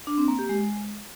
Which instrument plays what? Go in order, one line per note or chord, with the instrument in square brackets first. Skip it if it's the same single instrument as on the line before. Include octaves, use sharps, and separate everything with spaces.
[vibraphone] D4
C4
A#3
G4
G#3